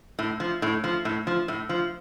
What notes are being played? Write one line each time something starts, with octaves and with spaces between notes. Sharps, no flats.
A2
F3
A2
F3
A2
F3
A2
F3